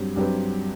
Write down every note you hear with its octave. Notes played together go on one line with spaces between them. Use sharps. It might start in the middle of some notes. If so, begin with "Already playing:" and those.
Already playing: G2 F#3 C4 G4
G2 F#3 C4 G4 B4